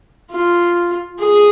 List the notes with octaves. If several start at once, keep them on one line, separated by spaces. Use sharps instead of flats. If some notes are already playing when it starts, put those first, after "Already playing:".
F4
G#4